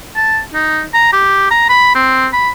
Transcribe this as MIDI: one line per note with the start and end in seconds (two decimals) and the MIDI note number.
0.16 0.39 81
0.54 0.83 63
0.94 1.11 82
1.13 1.51 67
1.51 1.68 82
1.69 1.91 83
1.95 2.27 60
2.33 2.50 83